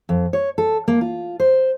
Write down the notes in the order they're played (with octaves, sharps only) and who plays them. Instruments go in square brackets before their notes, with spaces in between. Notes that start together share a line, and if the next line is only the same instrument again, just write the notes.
[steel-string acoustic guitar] F2
C#5
A4
A#3
F4
C5